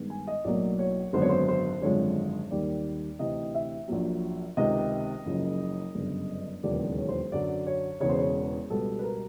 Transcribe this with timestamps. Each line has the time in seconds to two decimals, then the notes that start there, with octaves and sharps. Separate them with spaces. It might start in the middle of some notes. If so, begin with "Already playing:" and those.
Already playing: G2 D#3 G#3 B3
0.10 G#5
0.27 D#5
0.44 B1 A2 F#3 A#3 D5
0.79 C#5
1.13 G#1 F#2 D3 F#3 B3 C5
1.22 C#5
1.29 C5
1.48 C5
1.82 G#1 F#2 D3 F3 G#3 C#5
2.50 D#2 D#3 G3 A#3 D5
3.19 D2 C3 E3 D#5
3.55 E5
3.88 A#1 A#2 F#3
4.57 C#2 C3 D#3 D#5
5.26 F#1 F#2 C#3 F3
5.95 G1 F#2 C#3
6.63 E1 D#2 C#3 F#3 B3 D5
6.98 C#5
7.09 C5
7.32 F#2 D3 F#3 D5
7.67 C#5
8.00 E1 E2 C#3 C#5
8.09 C5
8.19 C#5
8.70 C#2 B2 G3 B3 A4
8.99 B4
9.03 A#4